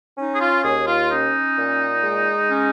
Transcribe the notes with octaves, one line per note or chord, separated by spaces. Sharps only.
C#4 D#4
G#4
F4
D#2 G#4
F4
C#4 D#4
A#2
G#3
C#4